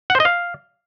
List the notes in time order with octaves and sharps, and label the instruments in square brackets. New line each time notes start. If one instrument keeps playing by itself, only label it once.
[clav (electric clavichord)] F#5
C5
D#5
F5